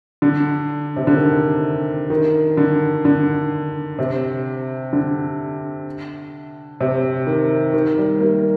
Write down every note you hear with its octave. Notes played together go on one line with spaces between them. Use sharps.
D3
C3
D3
D#3
D#3
D3
D3
C3
D3
C3
D#3
D#3
G3
A#3